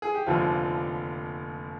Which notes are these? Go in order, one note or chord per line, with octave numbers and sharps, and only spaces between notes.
G#4
G4
F1 D#2 D3 F3 F4